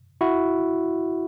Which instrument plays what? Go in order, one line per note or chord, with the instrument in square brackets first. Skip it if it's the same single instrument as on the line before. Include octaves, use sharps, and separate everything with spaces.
[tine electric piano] E4 F#4